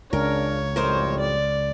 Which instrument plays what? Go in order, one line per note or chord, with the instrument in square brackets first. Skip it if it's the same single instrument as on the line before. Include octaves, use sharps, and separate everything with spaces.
[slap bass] C#2 [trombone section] C#3 D4 [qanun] A#4 [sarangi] C#5
[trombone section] F2 A2 G3 [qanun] A#4 C5 D#5
[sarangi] D5